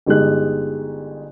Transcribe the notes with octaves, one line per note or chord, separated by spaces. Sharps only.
G1 G#3 D#4 G4 F#6